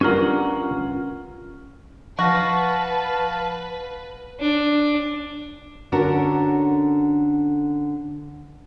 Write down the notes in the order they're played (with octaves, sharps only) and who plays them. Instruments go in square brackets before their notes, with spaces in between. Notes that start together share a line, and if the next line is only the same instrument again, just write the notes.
[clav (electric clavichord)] G2 A#4 [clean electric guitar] C#4 F4 F#5
[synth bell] F3 A#6 [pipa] F#4 [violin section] B4 [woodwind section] F5 A5
[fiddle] D4
[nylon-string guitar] D3 C#4 D4 F#4 A4 A#4